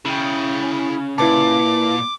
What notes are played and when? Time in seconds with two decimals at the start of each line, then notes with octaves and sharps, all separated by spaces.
0.06 C#3 E4 G5
1.18 A#2 E4 B4 A5 D6